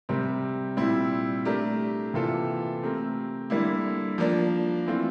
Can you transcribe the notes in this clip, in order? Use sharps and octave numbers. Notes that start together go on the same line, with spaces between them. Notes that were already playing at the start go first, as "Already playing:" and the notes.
C3 G3 C4 G4 A#4
A#2 G3 C4 E4
A3 D4 G4 A#4
C3 E3 A#3 F4 A4
A3 C4 G4 A#4
D3 G3 A#3 E4
F3 A#3 D4
E3 A3 C4 F4